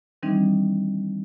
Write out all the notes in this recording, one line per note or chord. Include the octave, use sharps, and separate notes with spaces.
D#3 E3 G3 C4 D4 D#4